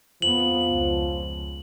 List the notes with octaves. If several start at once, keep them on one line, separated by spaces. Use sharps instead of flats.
F2 F3 B3 F#7
C#2